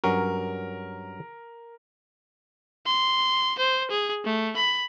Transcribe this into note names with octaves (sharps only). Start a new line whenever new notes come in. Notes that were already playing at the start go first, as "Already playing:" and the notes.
G2 F#3 C#4 A#4
C6
C5
G#4
A3
B5